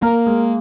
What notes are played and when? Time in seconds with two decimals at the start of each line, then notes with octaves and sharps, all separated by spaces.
0.02 A#3 A#4
0.26 G#3